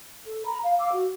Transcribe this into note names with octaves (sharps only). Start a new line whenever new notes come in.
A4
A#5 B5
F5
F5 D6 E6
F#4